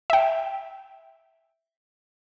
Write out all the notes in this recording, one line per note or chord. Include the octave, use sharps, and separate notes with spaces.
E5 G5